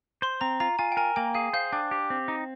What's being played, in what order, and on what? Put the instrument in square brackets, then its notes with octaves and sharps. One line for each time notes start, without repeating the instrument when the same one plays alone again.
[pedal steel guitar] C5 [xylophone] C6
[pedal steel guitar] C4 [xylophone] A#5
[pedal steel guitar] F4 [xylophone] A#5
[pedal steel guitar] F4 [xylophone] G#5
[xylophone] G5
[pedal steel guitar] A#4 [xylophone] G#5
[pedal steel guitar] A#3 [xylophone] G5
[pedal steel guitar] G#4 [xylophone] F5
[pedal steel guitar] C5 [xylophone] F5
[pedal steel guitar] D4 [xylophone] G5
[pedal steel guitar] G4
C4
D#4